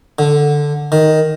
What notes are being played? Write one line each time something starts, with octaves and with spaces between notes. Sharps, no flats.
D3
D#3